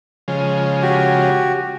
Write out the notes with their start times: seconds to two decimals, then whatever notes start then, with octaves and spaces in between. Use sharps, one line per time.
0.28 C#3 F3 G#3
0.82 F#4 G4